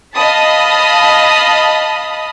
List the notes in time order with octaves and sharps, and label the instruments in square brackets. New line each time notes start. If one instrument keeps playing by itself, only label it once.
[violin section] D#5 F5 A5 B5 D#6